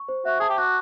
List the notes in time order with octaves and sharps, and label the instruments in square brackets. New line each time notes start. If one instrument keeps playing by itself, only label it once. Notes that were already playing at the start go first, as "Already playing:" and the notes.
Already playing: [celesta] C#6
C5
[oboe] F#4 [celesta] E5
[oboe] G#4 [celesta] A5
[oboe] G4
[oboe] F#4 [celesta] D6